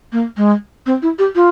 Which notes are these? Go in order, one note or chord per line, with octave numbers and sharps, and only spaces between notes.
A#3
G#3
C4
E4
G4
F4